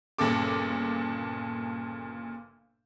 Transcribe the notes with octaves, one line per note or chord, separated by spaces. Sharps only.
G1 A#2 C#3 A4 D6